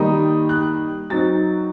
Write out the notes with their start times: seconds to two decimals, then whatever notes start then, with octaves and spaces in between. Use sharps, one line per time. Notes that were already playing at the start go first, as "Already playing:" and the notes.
Already playing: D#3 G3 A#3 D#4 D#6
0.49 F#6
1.10 F#3 C4 D#4 A6